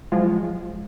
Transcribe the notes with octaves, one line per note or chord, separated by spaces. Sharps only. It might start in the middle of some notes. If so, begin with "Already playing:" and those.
F3 F#3 G#3 F4